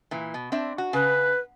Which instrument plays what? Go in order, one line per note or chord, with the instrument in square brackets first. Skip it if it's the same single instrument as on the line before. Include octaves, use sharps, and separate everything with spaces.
[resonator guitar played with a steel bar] A#2 E3
B2
C4 D4 E5
F#4
[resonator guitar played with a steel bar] C#3 [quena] B4